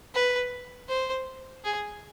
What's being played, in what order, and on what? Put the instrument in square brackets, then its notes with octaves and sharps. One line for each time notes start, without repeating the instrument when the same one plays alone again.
[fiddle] B4
C5
G#4